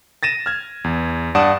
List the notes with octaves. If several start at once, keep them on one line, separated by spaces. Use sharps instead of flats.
A6 A#6 D#7 E7
F6 G#6
E2
G2 D5 F#5 A5 D#6 E7